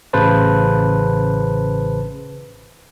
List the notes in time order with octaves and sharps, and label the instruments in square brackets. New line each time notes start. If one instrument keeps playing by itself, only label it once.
[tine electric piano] A1 C#3 B4 C5 A5